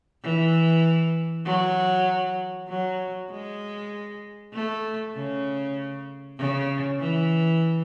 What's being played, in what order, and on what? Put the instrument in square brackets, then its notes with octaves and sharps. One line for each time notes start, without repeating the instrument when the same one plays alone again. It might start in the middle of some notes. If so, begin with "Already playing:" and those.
[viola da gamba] E3
F#3
F#3
G#3
A3
C#3
C#3
E3